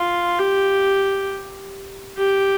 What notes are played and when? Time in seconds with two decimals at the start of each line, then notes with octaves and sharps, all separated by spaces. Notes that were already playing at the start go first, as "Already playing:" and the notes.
Already playing: F4
0.38 G4
2.17 G4